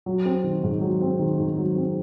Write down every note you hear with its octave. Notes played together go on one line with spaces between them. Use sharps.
F#3
C4
D#3
G#2
F#3
C4
D#3
G#2
F#3
C4